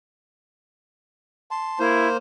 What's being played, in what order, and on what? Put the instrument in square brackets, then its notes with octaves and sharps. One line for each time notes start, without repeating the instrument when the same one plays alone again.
[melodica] A5 C6
[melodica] A#3 C5 [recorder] E4